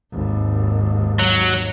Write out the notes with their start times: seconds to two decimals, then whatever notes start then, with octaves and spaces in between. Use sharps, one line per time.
0.12 G#1 D#2
1.19 F#3